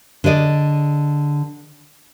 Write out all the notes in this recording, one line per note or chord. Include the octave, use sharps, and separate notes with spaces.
D3 G#4 D5 D#5